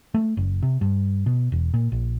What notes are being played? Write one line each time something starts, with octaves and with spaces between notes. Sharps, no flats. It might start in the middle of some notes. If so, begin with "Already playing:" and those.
A3
F#1
C3
G2
B2
E1
A#2
A#1